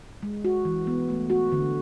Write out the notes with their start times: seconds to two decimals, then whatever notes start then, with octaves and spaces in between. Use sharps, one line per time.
0.23 G#3
0.45 F#4
0.65 E3
0.87 B3
1.09 A3
1.30 F#4
1.52 D3